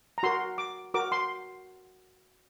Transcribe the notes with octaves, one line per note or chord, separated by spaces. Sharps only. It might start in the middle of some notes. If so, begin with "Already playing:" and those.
A#5
F#4 A#4 C6
D6
F#4 A#4 D6
C6